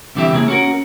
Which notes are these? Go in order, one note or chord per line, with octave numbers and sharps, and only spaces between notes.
C2 F2 D3 E3 G4 E5
C#3 A#3 G#4
C#4 F#4 A#4